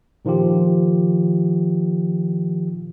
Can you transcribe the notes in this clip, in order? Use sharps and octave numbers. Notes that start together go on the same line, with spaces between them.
A#2 D#3 F3 F4 G4